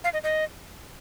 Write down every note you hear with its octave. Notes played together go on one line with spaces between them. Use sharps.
F5
D#5
D#5